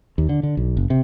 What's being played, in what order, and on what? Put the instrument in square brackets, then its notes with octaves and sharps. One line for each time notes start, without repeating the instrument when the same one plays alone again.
[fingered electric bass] D#2
D3
D3
B1
F#1
C3